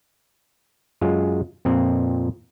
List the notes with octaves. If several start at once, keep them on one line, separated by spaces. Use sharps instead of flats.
F#2 G#3 F4
F2 A#2 C4